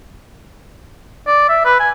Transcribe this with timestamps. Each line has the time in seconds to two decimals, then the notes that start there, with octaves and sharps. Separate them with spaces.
1.27 D5
1.49 E5
1.65 B4
1.80 G#5